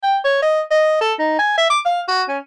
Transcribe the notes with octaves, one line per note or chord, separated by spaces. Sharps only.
G5
C#5
D#5
D#5
A4
D#4
G#5
E5
D6
F5
F#4
C#4